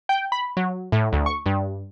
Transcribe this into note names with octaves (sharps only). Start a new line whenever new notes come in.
G5
B5
F#3
A2
D2
C#6
G2